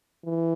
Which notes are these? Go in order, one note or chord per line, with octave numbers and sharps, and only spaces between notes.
E3